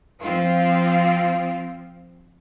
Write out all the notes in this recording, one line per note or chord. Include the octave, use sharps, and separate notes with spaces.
F3 C4 F4